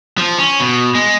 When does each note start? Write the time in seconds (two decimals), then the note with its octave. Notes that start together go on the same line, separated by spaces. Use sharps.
0.18 F3
0.39 C#4
0.60 B2
0.95 G#3